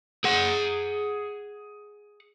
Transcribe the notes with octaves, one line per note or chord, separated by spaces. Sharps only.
G#4 F#5